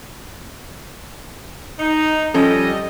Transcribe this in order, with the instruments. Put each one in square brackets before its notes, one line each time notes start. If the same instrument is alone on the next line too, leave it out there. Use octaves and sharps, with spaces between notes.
[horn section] D#4
[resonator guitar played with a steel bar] F3 C#4 A4 [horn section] G3 D#5